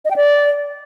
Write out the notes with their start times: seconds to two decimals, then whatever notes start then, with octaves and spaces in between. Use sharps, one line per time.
0.05 D#5
0.11 G5
0.16 D5